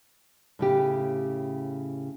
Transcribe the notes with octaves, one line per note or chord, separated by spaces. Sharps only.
A2 C#3 G4